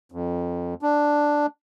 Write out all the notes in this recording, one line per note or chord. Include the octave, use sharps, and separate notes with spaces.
F2
D4